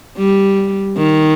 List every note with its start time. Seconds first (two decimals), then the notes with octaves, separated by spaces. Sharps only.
0.18 G3
0.97 D#3